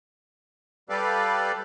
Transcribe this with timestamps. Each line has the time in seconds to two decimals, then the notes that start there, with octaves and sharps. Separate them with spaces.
0.89 G3 G4 A4 B4 D5 F5